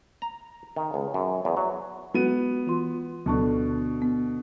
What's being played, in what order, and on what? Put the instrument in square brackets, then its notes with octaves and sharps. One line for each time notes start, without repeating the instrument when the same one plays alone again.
[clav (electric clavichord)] A#5
D#3
C#2
F#2
E2
F#3
[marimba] G#3 F#4 [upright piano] B3 D#7
[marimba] E3 F4 C6
[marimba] D2 A5 C#6 [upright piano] B2 D3
[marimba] B3